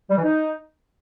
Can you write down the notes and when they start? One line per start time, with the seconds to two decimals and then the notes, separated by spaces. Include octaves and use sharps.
0.10 G3
0.17 E3
0.24 D#4